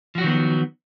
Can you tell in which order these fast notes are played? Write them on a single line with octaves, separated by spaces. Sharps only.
F3 F#4 F#3 D#3 B3